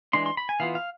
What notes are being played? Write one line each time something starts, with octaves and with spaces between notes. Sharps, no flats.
E3 G#3 D4 C6
C6
B5
G#5
E3 B3 F4 F5
F5